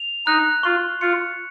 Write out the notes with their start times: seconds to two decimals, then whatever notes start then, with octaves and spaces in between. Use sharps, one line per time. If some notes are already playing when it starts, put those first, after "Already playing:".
Already playing: F7
0.27 D#4 F#6
0.63 F4 C#6
1.01 F4 C#7